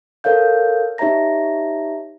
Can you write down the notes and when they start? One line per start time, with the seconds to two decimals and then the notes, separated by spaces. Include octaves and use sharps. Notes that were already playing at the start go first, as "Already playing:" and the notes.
0.24 A4 A#4 C#5 F5 G6
0.98 D#4 G4 C#5 E5 A#5 A#6